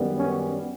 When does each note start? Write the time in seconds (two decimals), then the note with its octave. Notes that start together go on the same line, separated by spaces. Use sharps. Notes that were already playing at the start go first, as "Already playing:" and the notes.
Already playing: F#2 D#3 G3 B3
0.17 C#4